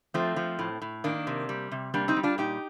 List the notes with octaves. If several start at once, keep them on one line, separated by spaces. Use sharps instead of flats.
F3 A3 C4
F3
A2
A2
D#3 A#3 D4
C3
G3
C3
G3 A#3 D4
C4 D#4
G3
D4 F4
A#2 D#4 G4